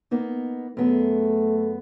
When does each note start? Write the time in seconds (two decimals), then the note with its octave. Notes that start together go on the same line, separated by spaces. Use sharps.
0.11 A#3 B3 D#4
0.77 F#2 A3 B3 G#4